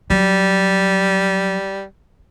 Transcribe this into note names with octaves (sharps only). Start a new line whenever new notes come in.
F#3 G3